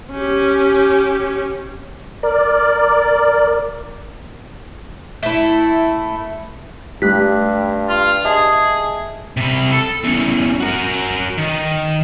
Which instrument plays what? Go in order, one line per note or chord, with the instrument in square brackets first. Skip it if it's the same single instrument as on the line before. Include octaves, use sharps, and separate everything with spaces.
[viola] C#4 G4
[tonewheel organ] A#4 D5
[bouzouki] A3 E4
[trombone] G2 [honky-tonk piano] G3 [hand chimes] A3 F#6 B6
[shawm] F4
[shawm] G#4 [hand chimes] D#5 E5 A5
[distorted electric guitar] C3 B5
A4
E2 C#4
F#4 A#4
D#3